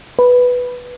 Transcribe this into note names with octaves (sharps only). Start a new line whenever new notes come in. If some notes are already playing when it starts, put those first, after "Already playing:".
B4